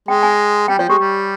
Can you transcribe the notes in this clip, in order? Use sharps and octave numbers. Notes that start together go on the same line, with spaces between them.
G#3 G5
G#5
G3 G5
F3 C#5
G#3 G4
G3